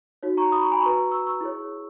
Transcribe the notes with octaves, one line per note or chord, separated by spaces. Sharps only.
D#4 F#4 C#5
A#5 C#6
B5 D#6
A#5 C#6
G#5 B5
F#4 B4 A#5 C#6
C#6 E6
C#6 E6
E4 G#4 C#5